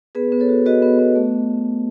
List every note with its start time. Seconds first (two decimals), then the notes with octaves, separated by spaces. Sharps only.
0.15 B3 G#4 B4
0.32 B3
0.40 A4 C#5
0.49 F#4
0.66 F#4 B4 D#5
0.82 B3
0.99 B3
1.16 A3